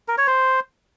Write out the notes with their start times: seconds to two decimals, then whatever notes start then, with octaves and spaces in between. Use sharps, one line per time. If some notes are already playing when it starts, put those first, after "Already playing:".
0.08 A#4
0.18 C#5
0.27 C5